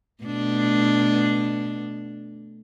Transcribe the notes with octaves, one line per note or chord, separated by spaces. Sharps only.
B2 A3 D4